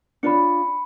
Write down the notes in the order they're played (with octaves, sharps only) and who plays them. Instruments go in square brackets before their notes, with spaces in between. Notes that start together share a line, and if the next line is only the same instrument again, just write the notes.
[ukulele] D4 F4 C#5 [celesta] B5 C#7